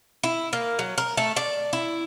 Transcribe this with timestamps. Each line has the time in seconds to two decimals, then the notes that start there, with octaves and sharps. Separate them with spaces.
0.23 E4
0.53 A#3
0.79 F#3
0.98 A#4
1.17 A3
1.36 D5
1.73 E4